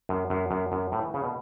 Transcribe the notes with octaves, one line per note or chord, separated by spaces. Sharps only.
F#2
F#2
F#2
F#2
A2
E3
C#3
B2